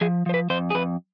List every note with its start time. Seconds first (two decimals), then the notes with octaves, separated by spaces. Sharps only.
0.01 F3 G#4
0.26 F3 C5
0.34 B4
0.50 F2 C5
0.70 G#4
0.75 F2 B4